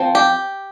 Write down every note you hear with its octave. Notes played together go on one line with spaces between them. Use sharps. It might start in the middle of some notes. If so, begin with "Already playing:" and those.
Already playing: F3 C4
G4